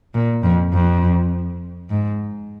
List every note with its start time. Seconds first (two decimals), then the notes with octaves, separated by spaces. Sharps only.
0.14 A#2
0.43 F2
0.73 F2
1.90 G#2